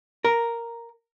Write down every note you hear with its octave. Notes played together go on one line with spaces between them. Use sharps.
A#4